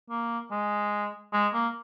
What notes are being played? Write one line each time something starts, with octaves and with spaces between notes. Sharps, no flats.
A#3
G#3
G#3
A#3